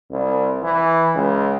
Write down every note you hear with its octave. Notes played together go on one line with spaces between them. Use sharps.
C2
E3
C#2